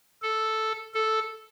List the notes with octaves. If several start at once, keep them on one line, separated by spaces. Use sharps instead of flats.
A4
A4